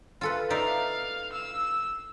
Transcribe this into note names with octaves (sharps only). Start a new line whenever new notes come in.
F4 A4 B4
D#4 D5 E5 F5
E6